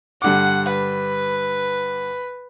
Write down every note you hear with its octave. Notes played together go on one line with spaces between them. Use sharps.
G2 D3 F#5 D6
B4